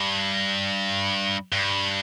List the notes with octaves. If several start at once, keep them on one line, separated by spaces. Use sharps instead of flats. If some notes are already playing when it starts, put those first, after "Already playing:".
Already playing: G2
G2